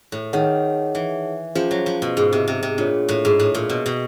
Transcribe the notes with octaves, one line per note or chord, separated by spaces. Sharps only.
A2
D#3 D#4 G#4 C#5 F#5
E3
F3 C#4 F4 G#4 C5 F5
F#3
F3
B2
G#2
C3
C3
C3
A#2 D4 F4 G#4 C#5
A2
G#2
A2
A#2
B2
B2